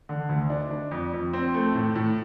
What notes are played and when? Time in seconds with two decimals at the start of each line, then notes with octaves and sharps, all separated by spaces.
0.09 D3
0.29 D2
0.50 D4
0.71 D4
0.91 F2
1.13 F2
1.33 C4
1.54 A3
1.75 A2
1.95 A2